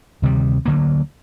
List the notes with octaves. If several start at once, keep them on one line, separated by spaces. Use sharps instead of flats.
D2 C3 D#3 G3
D2 D3 F#3 A#3